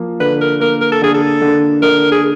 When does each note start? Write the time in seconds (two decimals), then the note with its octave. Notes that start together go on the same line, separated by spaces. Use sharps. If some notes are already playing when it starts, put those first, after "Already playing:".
Already playing: F3 A#3
0.20 D3 B4
0.41 A#4
0.60 A#3 A#4
0.81 A#4
0.92 A4
1.02 D3 G#4
1.14 A4
1.42 D3
1.82 D3 A#4
2.12 G#4